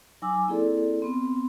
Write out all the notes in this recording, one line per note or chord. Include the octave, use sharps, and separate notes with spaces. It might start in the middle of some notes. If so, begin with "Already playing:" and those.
F#3 D#4 G#5 D6 E6
A#3 C4 E4 G#4 A4 D5
B3 C4